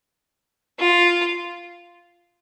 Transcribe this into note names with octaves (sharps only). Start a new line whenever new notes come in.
F4